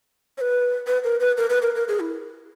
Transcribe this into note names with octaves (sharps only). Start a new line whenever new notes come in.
C#5
B4
B4
A#4
B4
A#4
B4
A#4
A#4
G#4
E4